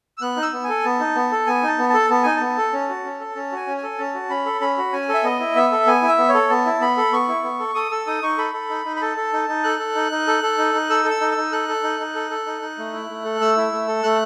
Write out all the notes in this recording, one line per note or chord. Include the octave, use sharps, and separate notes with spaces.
E6
B3 F#6
D#4
E6
B3
A4 G#5
B3 A5
D#4
B3
A4
B3 G#5
D#4 A5
B3
A4 A5
B3 A5
D#4 G#5
B3 A5
A4
C#4
F#4
C#4
A4
C#4 A5
F#4 G#5
C#4
G#5
A4
C#4 A5
F#4
C#4 B5
A4
C#4 B5
F#4
C#4 G#5
A4
E5
B3 D#5
E4
B3 E5
A4
B3 G#5
E4
E5
B3
C#5
A4
B3 A5
E4
B3 B5
A4
B3 C#6
E4
B3
A4
A4 D#6
A4 E6
D#4 D#6
D#4 C#6
A4 B5
A4
D#4
D#4
B5
A4 A5
A4
D#4
D#4
A4 F#6
A4
D#4
D#4
A4
A4
D#4
D#4
A4 E6
A4
E6
D#4
E6
D#4
A4 F#6
A4
D#4
D#4
A4
A4
D#4
D#4
A3
E4
A3
A4
A3 E6
E4
A3
A4
A3 F#6